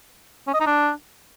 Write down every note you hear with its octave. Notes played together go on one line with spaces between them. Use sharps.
C#4
D#5
D#4
D4